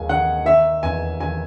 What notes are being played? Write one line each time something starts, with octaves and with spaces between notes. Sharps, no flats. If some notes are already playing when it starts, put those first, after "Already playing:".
Already playing: D#2 G#3 G#5
D#3 F#5
D#3 E5
E2 G#5
D#3 G#5